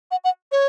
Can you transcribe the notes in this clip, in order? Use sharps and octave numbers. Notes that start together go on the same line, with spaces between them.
F#5
F#5
C#5